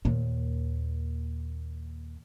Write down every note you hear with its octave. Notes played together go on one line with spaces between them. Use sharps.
D#2 A#2